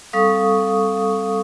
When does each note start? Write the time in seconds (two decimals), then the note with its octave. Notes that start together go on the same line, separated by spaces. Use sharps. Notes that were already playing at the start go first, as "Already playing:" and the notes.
0.13 G3 C4 A4 F5 C#6 D#6